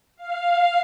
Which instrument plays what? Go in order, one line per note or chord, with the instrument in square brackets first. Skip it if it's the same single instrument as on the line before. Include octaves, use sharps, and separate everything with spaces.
[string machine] F5